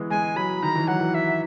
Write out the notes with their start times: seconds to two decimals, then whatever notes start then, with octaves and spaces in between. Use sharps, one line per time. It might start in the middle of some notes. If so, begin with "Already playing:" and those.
Already playing: E3 G#3 B3
0.10 G#3 G#5
0.36 F#3 B5
0.63 D#3 A#5
0.75 E3
0.88 F#3 F#5
1.01 E3
1.14 E5